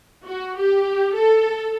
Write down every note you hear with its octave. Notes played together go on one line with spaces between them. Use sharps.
F#4
G4
A4